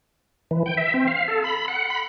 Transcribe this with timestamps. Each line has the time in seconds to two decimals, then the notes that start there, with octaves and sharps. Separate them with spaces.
0.51 E3
0.66 G5
0.77 E5
0.94 C4
1.07 F5
1.28 A4
1.44 B5
1.68 F#5
1.90 B5